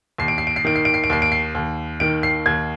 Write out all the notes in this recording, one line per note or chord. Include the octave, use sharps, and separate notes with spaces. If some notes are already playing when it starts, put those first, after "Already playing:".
D#2 C7
D7
C7
D7
C7
D#3 D7
C7
D7
C7
D7
D#2 C7
D7
C7
D#2
D#3 D7
C7
D#2 G#6